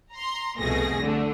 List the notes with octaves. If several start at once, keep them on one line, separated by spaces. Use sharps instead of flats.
A#5 C6
C2 F2 B2 A3 G#4 A#6
D3 A3 D4